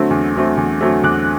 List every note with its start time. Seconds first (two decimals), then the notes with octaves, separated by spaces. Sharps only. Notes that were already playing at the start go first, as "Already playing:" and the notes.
Already playing: D3 F#3 A3 C4
0.10 E2
0.34 D3 F#3 A3 C4
0.57 E2
0.81 D3 F#3 A3 C4
1.03 E2 D6 F#6